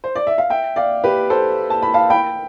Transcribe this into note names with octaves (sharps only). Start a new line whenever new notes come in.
C5
D5
E5
F5
E5 G5
D5 F5
G4 B4
A4 C5
A5
B5
F5 A5
G5 B5